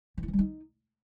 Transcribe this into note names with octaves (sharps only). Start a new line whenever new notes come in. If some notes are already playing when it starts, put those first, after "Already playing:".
E3
E4
E3
G3
D#4